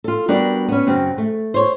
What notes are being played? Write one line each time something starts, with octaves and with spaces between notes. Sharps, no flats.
F4 A4
G3 B3 D4 F#4 A#4 D5
B3 C#4
F#2 C#3 C4
A3
C5 C#5